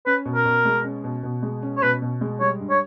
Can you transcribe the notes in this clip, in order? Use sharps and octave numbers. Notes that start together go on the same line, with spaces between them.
C#4 B4
B2
A#4
B2
G#3
C#4
B2
B2
G#3
C#4
C#5
B2 B4
B2
G#3
G3 C#5
G2
C#5